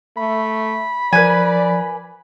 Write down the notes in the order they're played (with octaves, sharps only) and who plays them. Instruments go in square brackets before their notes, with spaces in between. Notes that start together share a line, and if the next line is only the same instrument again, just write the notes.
[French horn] A3 [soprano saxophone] B5
[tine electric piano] F3 A#4 [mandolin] B4 G#5 [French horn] D5